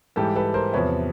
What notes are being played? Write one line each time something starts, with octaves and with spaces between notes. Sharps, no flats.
G#2 E3 G3 G4 A4
A4 B4
A#4 C5
E2 C3 F3 B4 C#5